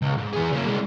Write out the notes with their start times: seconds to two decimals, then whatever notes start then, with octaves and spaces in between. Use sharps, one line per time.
0.02 C#2
0.18 G#2
0.33 E3 G#4
0.53 C#3 A#3
0.67 C2 G#3